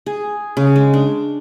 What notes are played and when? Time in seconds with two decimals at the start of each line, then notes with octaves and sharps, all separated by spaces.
0.06 G#4
0.57 C#3
0.76 G#3
0.94 D4